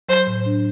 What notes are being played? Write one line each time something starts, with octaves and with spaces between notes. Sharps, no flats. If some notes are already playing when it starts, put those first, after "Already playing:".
F#3 C5
A2
D4